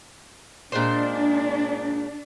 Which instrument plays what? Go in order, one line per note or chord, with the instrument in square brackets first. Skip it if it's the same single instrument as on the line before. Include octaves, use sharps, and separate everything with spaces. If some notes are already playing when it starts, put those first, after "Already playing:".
[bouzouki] A#2 G#3 C5 [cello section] D4